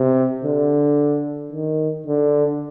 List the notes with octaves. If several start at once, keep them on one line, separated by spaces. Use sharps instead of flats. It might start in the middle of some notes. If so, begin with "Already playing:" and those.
Already playing: C3
D3
D#3
D3